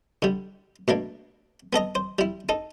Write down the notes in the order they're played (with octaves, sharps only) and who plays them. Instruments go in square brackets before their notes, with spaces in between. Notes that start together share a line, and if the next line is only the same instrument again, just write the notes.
[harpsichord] D3 G3
B2 A3 A#3 D4
B3 A4 D#5 A#5
C5
G3 E4
D#4 A4